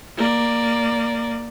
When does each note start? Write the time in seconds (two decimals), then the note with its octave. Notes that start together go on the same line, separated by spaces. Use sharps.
0.17 A#3 D5